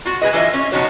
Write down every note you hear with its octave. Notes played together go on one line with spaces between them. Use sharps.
F4 F#4
G#3 G#4 B4 D#5
E3 F4 A#4 D#5 E5
C#4
B2 F3 G#3 D#4 F#4 C#5